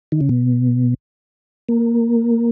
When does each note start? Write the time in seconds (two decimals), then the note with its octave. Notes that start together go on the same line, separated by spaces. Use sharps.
0.12 D#3
0.21 C#3
0.29 B2
1.69 A#3